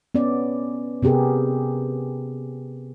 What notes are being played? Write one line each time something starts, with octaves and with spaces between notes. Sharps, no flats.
B3 C#4 D5
C3 B3 G4 G#4 A#4